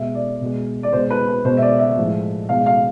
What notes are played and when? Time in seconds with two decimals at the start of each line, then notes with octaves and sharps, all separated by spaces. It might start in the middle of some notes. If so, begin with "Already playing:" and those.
Already playing: B2 G#3 E5
0.15 D5
0.41 B2 G#3
0.83 D5
0.93 B2 G#3 C5
1.11 B4
1.28 B4
1.45 B2 G#3 C5
1.57 E5
1.62 D5
1.79 E5
1.97 A2 F3 G#3
2.49 B2 G#3 F5
2.66 F5